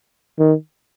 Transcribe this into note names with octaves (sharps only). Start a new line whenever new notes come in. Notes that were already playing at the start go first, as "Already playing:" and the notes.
D#3